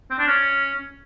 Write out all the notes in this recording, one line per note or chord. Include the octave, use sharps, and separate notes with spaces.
C4
D4
C#4